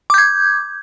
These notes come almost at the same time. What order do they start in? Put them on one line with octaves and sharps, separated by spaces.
D6 G6 G#6